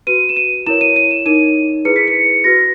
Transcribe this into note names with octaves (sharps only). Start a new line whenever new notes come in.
F#4 B4 D#7
E7
D#7
E4 A#4 C#5 E7
D#7
D#7
E7
D#4 A#4 C#5 D#7
E4 G#4 B4 C#7
B6
C#7
F#4 B4 A#6